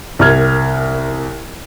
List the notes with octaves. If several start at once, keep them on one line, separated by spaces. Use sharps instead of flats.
C2 A#4 F6 G#6